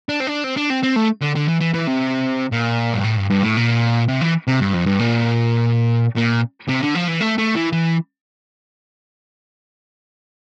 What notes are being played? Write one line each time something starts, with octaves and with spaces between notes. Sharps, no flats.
D4
C4
D4
C4
D4
C4
C4
A3
D3
D3
E3
E3
E3
C3
A#2
G2
A2
G2
G2
A2
A#2
C3
E3
C3
G2
F2
G2
A#2
A#2
C3
D3
F3
E3
A3
A3
E3
E3